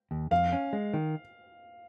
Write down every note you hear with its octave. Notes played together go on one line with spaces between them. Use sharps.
D#2
F2 F5
C#4
G#3
D#3